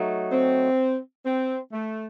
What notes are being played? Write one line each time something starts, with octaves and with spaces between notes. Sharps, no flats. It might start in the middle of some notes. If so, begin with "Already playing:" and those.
Already playing: F#3 A3 D#4
C4
C4
A3